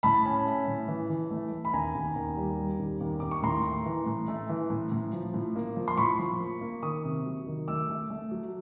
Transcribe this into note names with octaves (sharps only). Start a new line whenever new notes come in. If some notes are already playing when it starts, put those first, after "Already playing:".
A2 A5 B5
C#4
A3
A2
E3
E3
A3
A3
B5
D#2 G#5 A#5
D#2
D#2
G3
G3
D#2
D#2
D#2 D6
C#6
A2 A#5 C6
A3
E3
A2
A3
E3
A2
A2
F3
A2
A#3
F3
C6
A2 B5 C#6
F3
A#3
A#3
D#3 C#6 D#6
C3
F#3
D#3
A3 D6 E6
A3
A3
F#3